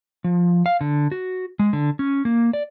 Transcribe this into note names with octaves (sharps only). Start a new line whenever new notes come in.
F3
F5
D3
F#4
G#3
D3
C#4
A#3
D5